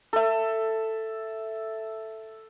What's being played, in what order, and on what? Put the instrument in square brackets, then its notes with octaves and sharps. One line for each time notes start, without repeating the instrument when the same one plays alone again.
[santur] A4 E5